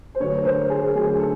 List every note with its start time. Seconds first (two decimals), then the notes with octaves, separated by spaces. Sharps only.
0.15 C5
0.20 D3 F#3 A3 B4 C#5
0.45 A#4 C5
0.70 G#4 A#4
0.95 D3 F#3 A3 G#4
1.20 A4